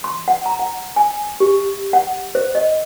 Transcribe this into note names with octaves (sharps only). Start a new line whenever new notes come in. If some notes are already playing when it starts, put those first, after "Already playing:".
C6
F#5
A#5
F#5
G#5
G4
F#5
C5
D#5